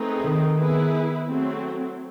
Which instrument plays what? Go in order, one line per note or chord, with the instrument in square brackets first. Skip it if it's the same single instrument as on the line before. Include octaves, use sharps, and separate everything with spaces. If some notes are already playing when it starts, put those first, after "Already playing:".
Already playing: [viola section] A3 C4 D#4 G#4 B4
[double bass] D#3
[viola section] B3 E4 G#4 B4
F#3 A3 C4